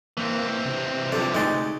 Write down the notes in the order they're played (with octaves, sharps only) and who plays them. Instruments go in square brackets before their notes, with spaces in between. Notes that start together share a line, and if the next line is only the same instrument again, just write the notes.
[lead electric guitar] E3 C4 [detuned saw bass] A#3
[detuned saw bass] C3
[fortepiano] D3 F3 [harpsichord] G3
[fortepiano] D2 G#3 [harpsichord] D#4 D5